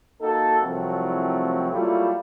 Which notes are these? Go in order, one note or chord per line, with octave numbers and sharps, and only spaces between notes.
A#3 D#4 F#4 A4
C2 A2 F3 F#3 A3 C4
F#3 G3 A3 A#3 E4 F4